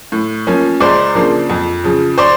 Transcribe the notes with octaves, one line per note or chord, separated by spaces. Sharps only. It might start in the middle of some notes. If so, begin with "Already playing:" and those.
A2
F3 A#3 C#4
C#2 C5 D5
C#3 F3 A#3 D4
F2
C#3 F3
C5 D5